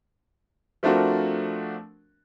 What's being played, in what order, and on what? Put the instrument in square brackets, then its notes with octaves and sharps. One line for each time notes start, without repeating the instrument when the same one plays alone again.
[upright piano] F3 A3 C4 D4 F#4 A#4